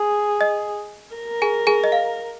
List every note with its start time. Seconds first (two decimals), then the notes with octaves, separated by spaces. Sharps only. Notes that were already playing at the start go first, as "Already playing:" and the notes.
Already playing: G#4
0.41 D#5
1.16 A#4
1.42 G#4 G#5
1.67 G#4 G#5
1.84 D#5
1.92 F5